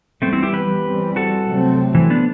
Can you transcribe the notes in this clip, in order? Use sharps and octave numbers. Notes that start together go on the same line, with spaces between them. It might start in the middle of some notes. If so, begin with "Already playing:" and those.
E3 G3 A3 B3 C4
C4 E4
E4 G4
G4 B4
E3 G3 C4
F#4 A4
C3 F#3 A3 C4
E3
B3 D4